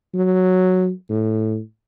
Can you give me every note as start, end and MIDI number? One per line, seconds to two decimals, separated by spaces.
0.14 0.90 54
1.09 1.59 45